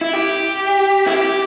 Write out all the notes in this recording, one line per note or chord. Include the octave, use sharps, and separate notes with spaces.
E4
G4
E4
G4